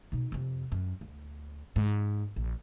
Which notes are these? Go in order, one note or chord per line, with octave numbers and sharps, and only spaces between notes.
B2 D#4
F2 C3
F#2
D2
G#2
A#1